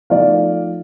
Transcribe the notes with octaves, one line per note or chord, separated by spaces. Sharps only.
F3 A3 D#4 D5 F5